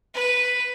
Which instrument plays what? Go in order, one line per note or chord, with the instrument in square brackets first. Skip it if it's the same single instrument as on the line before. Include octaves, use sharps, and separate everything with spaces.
[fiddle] B4